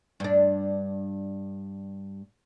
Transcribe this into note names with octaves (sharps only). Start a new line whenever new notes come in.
G2 D4